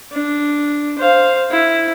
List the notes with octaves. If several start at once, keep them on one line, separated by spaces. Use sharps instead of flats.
D4
C5 F5
E4